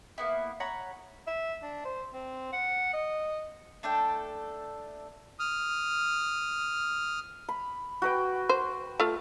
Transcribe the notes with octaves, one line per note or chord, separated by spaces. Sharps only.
A#3 B3 E4
C#5 F#5 A#5 B5
E5
D4
C5
C4
F#5
D#5
A3 D4 A4 G5
D#6 F6
B5
F#4 B4 G5
C5
A3 F4